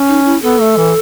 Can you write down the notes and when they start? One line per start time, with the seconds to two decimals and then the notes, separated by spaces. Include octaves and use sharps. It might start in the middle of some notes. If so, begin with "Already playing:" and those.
Already playing: C#4
0.09 D#4
0.25 E4
0.42 B3 A4
0.60 A3
0.77 E3